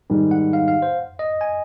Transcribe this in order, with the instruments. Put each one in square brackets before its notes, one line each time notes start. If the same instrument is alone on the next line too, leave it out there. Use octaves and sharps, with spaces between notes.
[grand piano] G#2 D#3 G3
[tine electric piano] F#5
F5
F5
C5
D#5
G#5